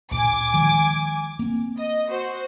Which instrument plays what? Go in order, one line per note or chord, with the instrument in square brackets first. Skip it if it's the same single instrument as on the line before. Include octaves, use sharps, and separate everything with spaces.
[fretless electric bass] D2 A#2 [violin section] G#5 D6
[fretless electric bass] D#3 F3 G#3
A#3 C4
[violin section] D#5
F#4 C5